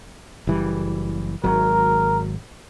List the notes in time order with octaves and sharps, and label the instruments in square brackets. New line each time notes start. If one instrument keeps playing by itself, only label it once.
[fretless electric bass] F#1 E3 G3
[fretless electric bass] G#1 F#3 [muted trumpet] A#4